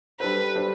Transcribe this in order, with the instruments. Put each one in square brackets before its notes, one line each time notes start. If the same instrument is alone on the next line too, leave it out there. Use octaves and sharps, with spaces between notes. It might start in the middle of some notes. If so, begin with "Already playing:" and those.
[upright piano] G3 D4 A4 C5 [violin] B4
[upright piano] G3 D4 A4 C5